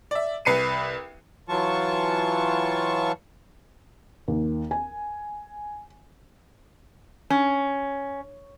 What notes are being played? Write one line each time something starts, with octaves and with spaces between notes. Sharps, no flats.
D5 E5
C2 B4 C7 C#7 D#7
E3 F#3 F4 A5 C#6
D#2
G#5
C#4